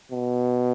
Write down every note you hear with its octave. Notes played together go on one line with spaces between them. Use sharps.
B2